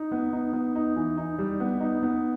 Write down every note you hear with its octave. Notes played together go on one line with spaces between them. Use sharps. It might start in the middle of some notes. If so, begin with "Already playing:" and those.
Already playing: D#4
B3
D#4
B3
D#4
E3
D#4
G3
B3
D#4
B3